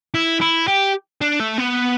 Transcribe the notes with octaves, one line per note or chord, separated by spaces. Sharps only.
E4
E4
G4
D4
A3
B3